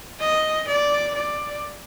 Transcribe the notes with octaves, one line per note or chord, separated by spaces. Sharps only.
D#5
D5
D5